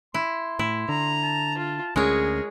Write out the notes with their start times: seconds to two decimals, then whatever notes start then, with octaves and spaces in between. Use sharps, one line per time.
0.14 E4 C6
0.59 A2 E4
0.89 D3 A#5
1.22 A5
1.58 F4
1.96 D2 G#3 C#4 G#4 A#4 C#5